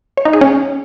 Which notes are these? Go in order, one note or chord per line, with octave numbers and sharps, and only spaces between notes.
C#5
D#4
G#4
C#4